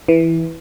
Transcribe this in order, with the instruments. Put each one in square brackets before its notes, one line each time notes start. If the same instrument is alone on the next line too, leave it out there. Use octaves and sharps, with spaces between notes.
[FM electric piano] E3